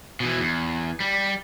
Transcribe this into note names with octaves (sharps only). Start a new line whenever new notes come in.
B2 E3
E2
G3